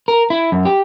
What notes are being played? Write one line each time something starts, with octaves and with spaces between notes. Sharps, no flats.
A#4
E4
F#2
G4